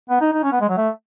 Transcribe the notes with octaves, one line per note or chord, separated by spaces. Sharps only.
B3
D#4
D#4
C#4
B3
G#3
F#3
A3